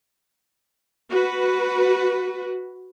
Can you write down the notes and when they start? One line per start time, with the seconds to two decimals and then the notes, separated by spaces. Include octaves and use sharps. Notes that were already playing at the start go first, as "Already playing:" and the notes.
1.11 F#4 B4